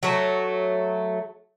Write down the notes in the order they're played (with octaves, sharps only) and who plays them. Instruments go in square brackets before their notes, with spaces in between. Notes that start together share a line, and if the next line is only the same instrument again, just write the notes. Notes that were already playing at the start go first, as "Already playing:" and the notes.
[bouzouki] F#3 A3